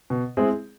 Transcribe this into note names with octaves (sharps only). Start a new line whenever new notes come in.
B2
G#3 C4 E4 G#4